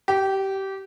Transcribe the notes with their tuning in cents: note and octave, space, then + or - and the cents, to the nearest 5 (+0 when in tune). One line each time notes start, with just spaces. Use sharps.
G4 -20